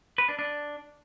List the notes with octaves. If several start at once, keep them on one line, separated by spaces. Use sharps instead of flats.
B4
D4
D4